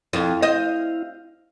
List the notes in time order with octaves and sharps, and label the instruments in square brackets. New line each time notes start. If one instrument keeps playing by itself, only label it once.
[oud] F2 [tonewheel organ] E4 F5
[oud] C5 D#5